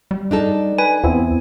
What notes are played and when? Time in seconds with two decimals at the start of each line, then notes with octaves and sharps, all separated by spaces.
0.11 G3
0.31 D4 D#4 A4
0.78 B4 G#5
1.04 E2 B3 C4 E4